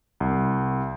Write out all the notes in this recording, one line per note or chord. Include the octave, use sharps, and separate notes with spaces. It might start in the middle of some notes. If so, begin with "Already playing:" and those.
C2